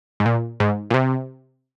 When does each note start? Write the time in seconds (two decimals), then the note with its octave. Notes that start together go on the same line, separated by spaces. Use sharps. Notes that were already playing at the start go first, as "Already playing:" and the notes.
0.20 G#2
0.26 A#2
0.60 G#2
0.90 A#2
0.94 C3